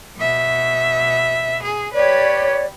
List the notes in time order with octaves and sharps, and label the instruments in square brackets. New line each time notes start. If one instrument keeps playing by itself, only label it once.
[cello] B2 E5
G#4
[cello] G4 B4 [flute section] C#5 D5